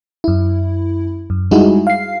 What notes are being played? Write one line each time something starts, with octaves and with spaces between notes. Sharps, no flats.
F#2 E4
F#2
G3 G#3 D#4 E4 F#4 G#4
F5 C7